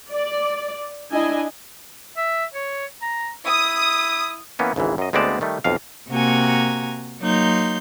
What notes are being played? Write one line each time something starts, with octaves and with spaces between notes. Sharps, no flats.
D5
D4 E4 D#5 G#5
E5
C#5
A#5
E4 D#6
E3 A#3 B3 C#4
G#1 C#2 G#2 E3
F#2 D#5
D2 G#3 B3 C4 D5 A5
D#3 G3 A3
B1 F2 F5
C3 A#3 F#4 G#5 A#5
F#3 A#3 D#4 C6 G6